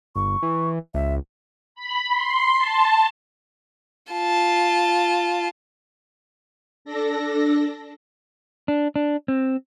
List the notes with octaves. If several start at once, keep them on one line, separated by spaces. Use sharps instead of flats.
G1 C#6
E3
C#2 E5
B5
C6
A5
F4 A5
D4 A4 A#6
D4
D4
C4